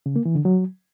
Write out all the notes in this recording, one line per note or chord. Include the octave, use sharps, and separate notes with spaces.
C#3
A#3
E3
D3
F#3